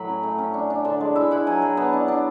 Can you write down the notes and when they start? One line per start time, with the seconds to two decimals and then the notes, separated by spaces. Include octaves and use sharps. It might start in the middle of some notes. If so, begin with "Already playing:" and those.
Already playing: A2 F#3 B5
0.09 C#4
0.23 A3
0.38 C#4
0.54 D4
0.70 D4
0.85 D3 A5
1.00 G#3
1.16 E4 E5
1.31 E4 F#5
1.47 F#3 G#5
1.62 F#3
1.77 B3 A5
1.93 D4
2.08 D4